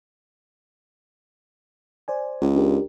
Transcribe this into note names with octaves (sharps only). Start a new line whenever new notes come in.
C5 D5 G#5
C#2
D4 G4 A#4